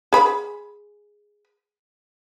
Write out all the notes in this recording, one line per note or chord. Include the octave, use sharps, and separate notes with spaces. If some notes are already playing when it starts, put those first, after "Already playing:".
G#4 B5